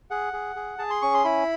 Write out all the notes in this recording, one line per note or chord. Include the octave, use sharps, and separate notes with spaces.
G#4 F#5
G#4
G#4
G#4 A5
C6
C#4 C#6
C6
E4 B5